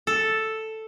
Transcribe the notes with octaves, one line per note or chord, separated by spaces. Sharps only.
A4